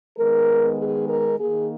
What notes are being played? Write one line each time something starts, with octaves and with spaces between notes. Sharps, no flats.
D#3 G#3 B3 A#4
G#4
A#4
D#3 A#3 G#4